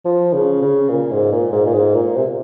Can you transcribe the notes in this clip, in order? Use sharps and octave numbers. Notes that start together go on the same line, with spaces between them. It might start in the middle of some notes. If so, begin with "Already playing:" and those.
F3
C#3
C#3
A#2
G#2
A#2
G#2
A#2
G#2
A#2
C3